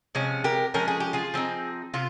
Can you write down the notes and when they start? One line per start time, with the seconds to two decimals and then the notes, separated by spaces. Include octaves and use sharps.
0.15 C3 F3 G#3 C#4
0.44 G4 A#4
0.74 F3 G#3 C#4 A#4
0.88 G#4
1.00 G4
1.13 F4 G#4
1.34 F3 C4 D#4
1.94 C3 F4